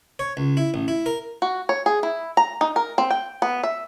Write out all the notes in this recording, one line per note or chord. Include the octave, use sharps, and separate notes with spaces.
C#5
C#2
E4
A1
E4
A#4
F#4
C#5
G#4
E4
A#5
D#4
A#4
C4
G5
B3
E5